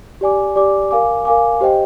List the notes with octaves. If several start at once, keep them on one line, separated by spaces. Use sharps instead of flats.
G4 D5 G#5 D6
G4 D5 G#5 D6
A#4 F5 G#5 D6
A#4 F5 G#5 D6
G4 C5 D#5 G5